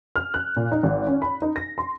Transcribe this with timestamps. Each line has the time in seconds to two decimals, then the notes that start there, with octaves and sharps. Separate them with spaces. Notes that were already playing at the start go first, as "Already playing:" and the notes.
0.16 F6
0.34 F#6
0.56 A#2
0.72 D#4
0.83 G#1
1.07 C#4
1.22 B5
1.42 D#4
1.56 A#6
1.78 C6